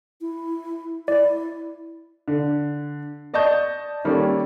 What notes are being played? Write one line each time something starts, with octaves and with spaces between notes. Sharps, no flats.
E4
E4 D5
D3
D5 D#5 A5 C#6 G6
D#3 G3 A#3 C#4 A4